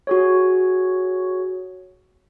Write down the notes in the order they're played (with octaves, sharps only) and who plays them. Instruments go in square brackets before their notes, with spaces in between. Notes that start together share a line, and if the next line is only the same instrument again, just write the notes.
[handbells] F#4 G#4 C#5